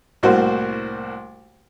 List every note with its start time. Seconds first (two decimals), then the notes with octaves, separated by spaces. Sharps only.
0.23 C2 A2 A#3 F#4 C5